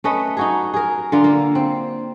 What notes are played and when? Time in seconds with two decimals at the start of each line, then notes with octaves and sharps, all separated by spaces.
0.04 A3 C#4 B4 D#5
0.37 D#4 F#4 G#4
0.74 G#4 A#4
1.12 D3 F4 A#4
1.24 A#3
1.55 C4